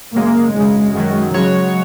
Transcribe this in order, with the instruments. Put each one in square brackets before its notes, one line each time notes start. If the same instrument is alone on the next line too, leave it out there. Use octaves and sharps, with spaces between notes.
[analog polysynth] F#2 C#3 G#3 [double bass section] A#3
[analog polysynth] G#1 F#2 C#3 [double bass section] G#3
[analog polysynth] F#2 D#3 F#3
[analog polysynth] C#3 G#3 F#4 C#5 [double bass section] F#3